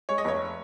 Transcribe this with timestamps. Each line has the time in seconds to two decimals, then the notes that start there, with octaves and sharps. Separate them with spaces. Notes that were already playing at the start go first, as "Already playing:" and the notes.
0.09 G#3 C#5
0.18 D#5
0.25 F1 C#5